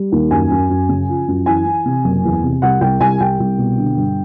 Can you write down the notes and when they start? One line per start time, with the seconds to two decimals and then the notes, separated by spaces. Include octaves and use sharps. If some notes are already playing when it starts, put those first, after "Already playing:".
Already playing: G3
0.12 D#2
0.31 F#2 G#5
0.50 F#2
0.70 F#2
0.89 C#3
1.09 F3
1.28 F#2
1.46 E3 G#5
1.66 E3
1.85 C3
2.04 F#1
2.24 E2
2.43 C3
2.62 C2 F#5
2.81 C2 G5
3.00 C2 G#5
3.20 C2 G5
3.40 C2
3.58 B2
3.78 D3
3.97 G1